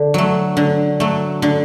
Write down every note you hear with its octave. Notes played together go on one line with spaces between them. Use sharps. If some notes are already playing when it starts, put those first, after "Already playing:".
Already playing: D3
F#3 A3
D3
F#3 A3
D3